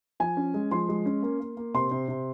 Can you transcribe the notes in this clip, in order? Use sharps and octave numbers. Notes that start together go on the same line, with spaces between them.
F3 G#5
C#4
G#3
F3 C6
G#3
C#4
A#3
A#3
A#3
C3 C6
C3
C3